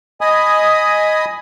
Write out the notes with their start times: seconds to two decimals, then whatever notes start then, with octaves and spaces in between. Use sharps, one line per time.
0.21 D#5 G#5 B5 D#6